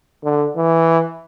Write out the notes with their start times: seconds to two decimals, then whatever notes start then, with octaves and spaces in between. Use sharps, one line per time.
0.24 D3
0.56 E3